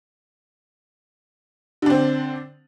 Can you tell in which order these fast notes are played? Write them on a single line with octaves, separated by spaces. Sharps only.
D3 D4 C4